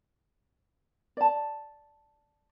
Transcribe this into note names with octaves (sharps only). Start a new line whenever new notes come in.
D5 A5